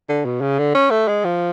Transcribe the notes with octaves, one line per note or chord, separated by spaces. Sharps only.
D3
B2
C#3
D3
C#4
A3
G#3
F3